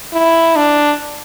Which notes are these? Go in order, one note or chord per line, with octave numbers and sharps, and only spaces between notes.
E4
D4